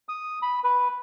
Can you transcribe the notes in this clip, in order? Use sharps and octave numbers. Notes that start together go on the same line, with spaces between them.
D#6
B5
B4